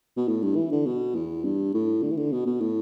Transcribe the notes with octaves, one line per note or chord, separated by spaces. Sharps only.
B2
A2
G2
E3
D3
B2
E2
G2
A2
D3
E3
D3
B2
B2
A2